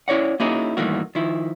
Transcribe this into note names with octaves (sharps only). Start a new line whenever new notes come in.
C#4 E4 C#5 D5 F#5
A#3 C#4 D#4 E4 F#4 G#4
G2 D#3 E3 A3 A#3 F#4
D#3 F3 E4